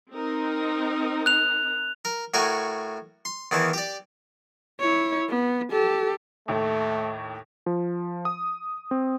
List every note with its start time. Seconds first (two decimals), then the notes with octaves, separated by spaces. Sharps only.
0.12 C4 D#4 A#4
1.26 F#6 F7
2.05 A#4
2.34 A2 F#4 A#4 G#5 C#6
3.25 C6
3.51 E2 D#3 E3 A5
3.73 G4 D5
4.80 E4 C#5
5.30 B3
5.71 G4 A4
6.48 D#2 A2 A3
7.66 F3
8.25 D#6
8.91 C4